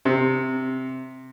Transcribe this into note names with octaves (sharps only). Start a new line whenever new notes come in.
C3